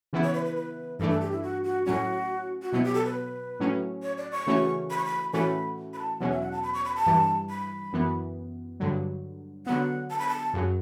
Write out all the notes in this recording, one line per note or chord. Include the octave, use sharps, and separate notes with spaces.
C#3 E3 B3 E4
C#5
B4
B4
B4
G2 E3 A3 D4 A4
A4
G4
E4
F#4
F#4
A2 F#3 C#4 F#4
F#4
B2 F#3 B3 E4
G4
A4
B4
A2 F#3 C#4
C#5
D5
C#6
C#3 E3 A3 C#4 F#4
B5
C#6
B5
A2 E3 A3 C#4 F#4 B5
B5
A5
E2 B2 F#3 C#4 F#4 F#5
E5
F#5
A5
B5
C#6
B5
A5
G2 E3 G3
B5
F#2 E3 B3
G2 D3 F#3
D3 F#3 B3 F#5
A5
B5
A5
F#2 C#3 F#3